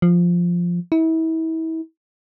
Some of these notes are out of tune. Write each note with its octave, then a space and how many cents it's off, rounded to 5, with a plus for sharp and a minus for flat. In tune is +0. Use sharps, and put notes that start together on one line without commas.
F3 +0
E4 -35